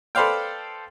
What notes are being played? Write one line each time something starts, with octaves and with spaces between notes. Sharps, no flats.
A4 B4 C5 D5 F5 G5